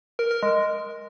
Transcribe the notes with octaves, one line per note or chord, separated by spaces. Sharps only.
A#4
A#4
G#3